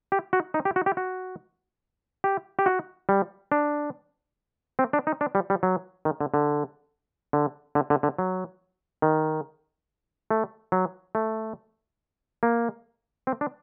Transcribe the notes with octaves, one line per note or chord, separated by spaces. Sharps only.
G4
F#4
D#4
G4
F#4
G4
F#4
G4
G4
F#4
G3
D4
C4
D4
D#4
D4
G3
G3
F#3
D#3
D3
D3
D3
D3
D3
D3
F#3
D#3
A3
F#3
A3
A#3
C4
D4